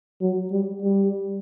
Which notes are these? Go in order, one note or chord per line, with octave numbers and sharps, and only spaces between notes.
F#3
G3
G3